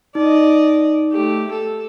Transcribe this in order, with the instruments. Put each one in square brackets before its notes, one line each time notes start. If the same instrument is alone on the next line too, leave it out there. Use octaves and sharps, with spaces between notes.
[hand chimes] D#4 [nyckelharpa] D5 D#5
[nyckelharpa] A3 G4
A4